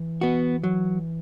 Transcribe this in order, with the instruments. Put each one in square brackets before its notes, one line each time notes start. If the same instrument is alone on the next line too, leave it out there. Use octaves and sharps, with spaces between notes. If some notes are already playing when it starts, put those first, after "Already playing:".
Already playing: [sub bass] E3
[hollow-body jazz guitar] B3 F#4
F#3